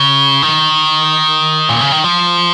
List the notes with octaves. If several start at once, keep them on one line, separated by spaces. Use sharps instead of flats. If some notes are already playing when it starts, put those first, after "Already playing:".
Already playing: C#3
D#3
A#2
C#3
D#3
F3